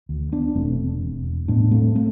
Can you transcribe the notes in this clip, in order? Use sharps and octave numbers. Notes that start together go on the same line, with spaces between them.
D2
B3 D4
E1 A3 C4
E1
A2 B3 D4
A3 C4
A3 C4